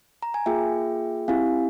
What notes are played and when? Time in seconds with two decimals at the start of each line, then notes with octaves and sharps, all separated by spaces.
0.23 A#5
0.34 G#5
0.46 A#3 F4 G#4 E5 G5
1.28 C4 E4 G4 F5 G#5